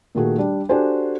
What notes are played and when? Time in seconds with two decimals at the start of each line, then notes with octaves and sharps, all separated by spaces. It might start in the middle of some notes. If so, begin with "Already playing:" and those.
0.15 A#2 D#3 A3 F#4 G#4
0.38 G3 D4
0.69 D4 F#4 G4 A4 C5 G#5